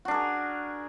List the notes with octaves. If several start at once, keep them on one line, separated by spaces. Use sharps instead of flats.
D4 F#4 G#4 A#4